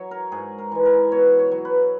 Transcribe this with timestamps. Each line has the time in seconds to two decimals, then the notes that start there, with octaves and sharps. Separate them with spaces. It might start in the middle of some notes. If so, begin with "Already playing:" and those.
Already playing: F#3 C#5
0.11 A#4
0.32 G#2 G#4
0.58 A#4
0.72 E3 G#3
0.85 A#4
1.12 B2 C#5
1.39 C#5
1.51 F#3
1.65 B4